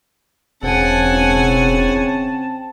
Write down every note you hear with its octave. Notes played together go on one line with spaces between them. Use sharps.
E1 C#3 C4 F#5 G#5 A5